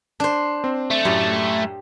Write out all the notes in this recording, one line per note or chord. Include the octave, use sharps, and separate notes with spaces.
D4 C5
C4
A3
F#2 A2 G4